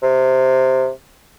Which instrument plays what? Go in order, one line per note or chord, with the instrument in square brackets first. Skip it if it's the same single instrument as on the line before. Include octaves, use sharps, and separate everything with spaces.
[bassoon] C3